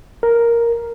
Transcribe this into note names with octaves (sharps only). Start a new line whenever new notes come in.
A#4